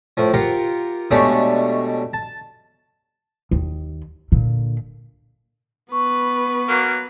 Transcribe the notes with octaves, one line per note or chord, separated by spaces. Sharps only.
A2 F3
F4 G4 A#4 F5 F#5
B2 G#3 A3 C#4 D4 G4
A5
D#2
A#2 D3
B3 B4 C#6
F#3 A#3